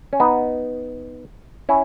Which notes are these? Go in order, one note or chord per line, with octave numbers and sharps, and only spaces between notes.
C#4
B3 D#4
C#4 E4